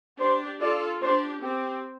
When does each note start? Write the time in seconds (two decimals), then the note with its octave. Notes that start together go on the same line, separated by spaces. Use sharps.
0.20 D4 G4 C5
0.61 F4 A4 D5
1.02 D4 G4 C5
1.43 C4 G4